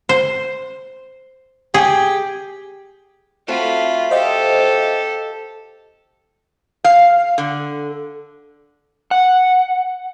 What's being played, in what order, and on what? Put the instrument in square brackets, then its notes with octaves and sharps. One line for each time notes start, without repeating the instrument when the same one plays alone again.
[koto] C5
[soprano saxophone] G4 [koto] G#4
[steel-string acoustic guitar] A3 C4 F#4 [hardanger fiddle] F4 B5
[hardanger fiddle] G4 A4 [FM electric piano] C5 D#5 F5
[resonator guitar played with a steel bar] F5
D3
[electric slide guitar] F#5